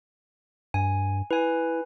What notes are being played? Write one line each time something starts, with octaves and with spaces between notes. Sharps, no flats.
G2 G#5
E4 B4 G#5